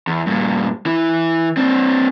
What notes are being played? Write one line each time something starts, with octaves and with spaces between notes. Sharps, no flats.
E2
G2 A#2
E3 E4
C4 D4